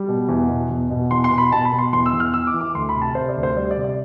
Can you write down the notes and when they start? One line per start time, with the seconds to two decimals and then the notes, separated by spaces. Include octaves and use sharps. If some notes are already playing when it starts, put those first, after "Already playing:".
Already playing: G3
0.09 B2
0.29 E2
0.49 B2
0.70 E2
0.90 B2
1.11 E2 C6
1.24 C6
1.31 B2
1.38 B5
1.52 B2 A5
1.65 B5
1.72 B2
1.78 C6
1.93 E2 C6
2.06 E6
2.13 E2
2.20 F6
2.34 E3 E6
2.47 D6
2.54 E3
2.61 D6
2.75 D2 C6
2.89 B5
2.95 C3
3.02 A5
3.15 C3 C5
3.29 D5
3.36 D2
3.43 C5
3.56 G3 D5
3.71 D5
3.77 C3
3.84 D5